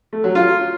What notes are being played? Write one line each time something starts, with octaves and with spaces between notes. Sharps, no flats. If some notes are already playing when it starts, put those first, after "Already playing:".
A3
F#3
F4